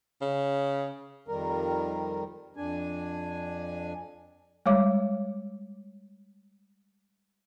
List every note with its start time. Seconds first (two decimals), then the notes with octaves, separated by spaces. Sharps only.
0.21 C#3
1.28 F2 D#3 G3 A#4
2.56 F2 D4 G#5
4.66 G3 G#3 C#5 D6